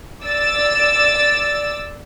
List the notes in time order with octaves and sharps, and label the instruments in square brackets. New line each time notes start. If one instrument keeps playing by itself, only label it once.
[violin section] D5 E6 A6